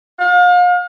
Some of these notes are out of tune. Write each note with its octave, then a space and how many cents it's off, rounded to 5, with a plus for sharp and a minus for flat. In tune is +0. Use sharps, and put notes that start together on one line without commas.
F5 +35